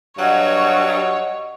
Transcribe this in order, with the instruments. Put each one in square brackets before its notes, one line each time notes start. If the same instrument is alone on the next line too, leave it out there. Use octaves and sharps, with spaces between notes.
[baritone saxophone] G2 [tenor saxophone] F#3 [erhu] C#5 [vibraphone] D#5 F#5